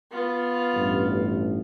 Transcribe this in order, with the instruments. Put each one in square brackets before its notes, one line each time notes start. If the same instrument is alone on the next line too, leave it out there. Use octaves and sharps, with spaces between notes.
[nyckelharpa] B3 F4
[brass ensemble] A1 G2